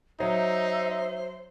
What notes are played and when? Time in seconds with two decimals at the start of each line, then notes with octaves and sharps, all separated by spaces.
0.20 F#3 D#4 C5 E5